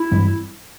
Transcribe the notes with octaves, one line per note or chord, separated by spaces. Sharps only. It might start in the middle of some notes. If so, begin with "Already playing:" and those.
Already playing: E4
G2 E3 G#3 C4